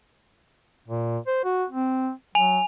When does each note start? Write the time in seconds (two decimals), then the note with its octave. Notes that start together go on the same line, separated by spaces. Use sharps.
0.88 A#2
1.27 C5
1.45 F#4
1.70 C4
2.35 F#3 G#5 F7